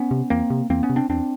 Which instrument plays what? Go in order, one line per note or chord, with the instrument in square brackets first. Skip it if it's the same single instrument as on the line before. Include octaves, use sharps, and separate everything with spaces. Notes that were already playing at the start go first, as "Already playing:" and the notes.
Already playing: [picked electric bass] B3 C#4
C3
E2 A#3 C4
C3
E2 A#3 C4
B3 C#4
C3
C4 D4
E2 C4 D4